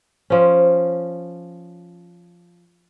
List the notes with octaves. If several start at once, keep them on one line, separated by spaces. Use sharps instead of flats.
F3 C#4